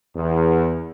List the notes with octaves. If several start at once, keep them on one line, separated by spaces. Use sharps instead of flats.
E2